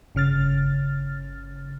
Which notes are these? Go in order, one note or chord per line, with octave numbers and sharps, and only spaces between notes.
G1 C#3 F6 A6